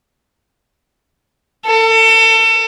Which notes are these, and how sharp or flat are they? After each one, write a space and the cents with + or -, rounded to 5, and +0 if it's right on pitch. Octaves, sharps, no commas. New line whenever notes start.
A4 +30